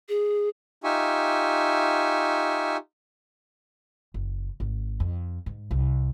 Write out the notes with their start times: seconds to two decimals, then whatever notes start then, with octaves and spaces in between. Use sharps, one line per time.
0.09 G#4
0.84 D#4 F4 G4 E5 G#5 C#6
4.14 F#1
4.60 G#1
5.00 F2
5.46 G#2
5.71 C2